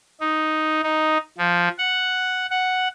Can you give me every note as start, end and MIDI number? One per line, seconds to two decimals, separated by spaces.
0.21 0.82 63
0.83 1.18 63
1.38 1.68 53
1.78 2.46 78
2.50 2.88 78